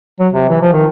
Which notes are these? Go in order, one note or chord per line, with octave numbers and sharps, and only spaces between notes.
F#3
C3
E3
F3
D#3